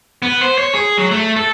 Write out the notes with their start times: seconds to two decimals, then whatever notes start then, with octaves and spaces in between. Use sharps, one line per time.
0.22 B3
0.41 C5
0.58 C#5
0.75 G#4
0.97 F#3
1.11 A3
1.36 A4